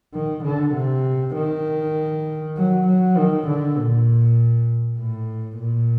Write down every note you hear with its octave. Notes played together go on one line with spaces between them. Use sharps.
D#3
D3
C3
D#3
F#3
F#3
D#3
D3
A#2
A2
A#2